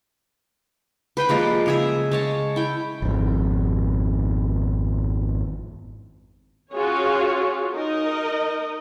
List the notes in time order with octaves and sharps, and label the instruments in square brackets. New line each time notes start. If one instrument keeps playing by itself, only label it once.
[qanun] B4 C5 G5 B5
F3 G3 G#3 A#3
C#3 G#4 E5
G#3 C#5 A5
E4 G5
[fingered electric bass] G#1 F2
[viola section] C#4 F4 F#4 G#4 C#5
D#4 A#4 D#5